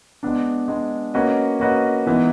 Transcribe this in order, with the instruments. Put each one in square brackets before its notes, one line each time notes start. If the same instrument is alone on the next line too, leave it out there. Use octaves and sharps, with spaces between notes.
[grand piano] G#3 B3 D4
G#3 B3 D4
A#3 C#4 F#4 B4 D#5
A#3 C#4 F#4 B4 D#5
E3 G#3 B3 D#4